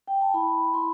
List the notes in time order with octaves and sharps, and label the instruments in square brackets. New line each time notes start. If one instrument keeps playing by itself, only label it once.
[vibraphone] G5
A5
E4 B5
E4 C6